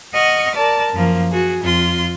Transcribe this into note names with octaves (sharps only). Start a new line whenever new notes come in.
D#5 F#5 C#6 D#6 F6
A#4 D5 A5
F#2 F3 A#3
F#4 G#4
F2 F4 C6